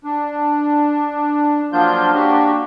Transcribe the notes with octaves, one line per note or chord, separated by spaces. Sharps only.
D4
F3 F#3 A#3 D4 F4 G6
A#3 D4 F#4 G4